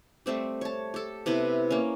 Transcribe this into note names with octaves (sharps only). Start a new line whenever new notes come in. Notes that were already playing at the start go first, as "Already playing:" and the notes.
G3 A3 C4 G4
C#5 A5
G4 A4
C3 B3 E4 B4
A#3 C#4